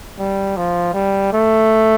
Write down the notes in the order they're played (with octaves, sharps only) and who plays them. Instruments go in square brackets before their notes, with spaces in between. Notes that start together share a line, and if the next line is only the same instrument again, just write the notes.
[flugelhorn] G3
F3
G3
A3